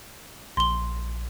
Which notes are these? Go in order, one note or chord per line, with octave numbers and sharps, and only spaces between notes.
A#1 C6 G7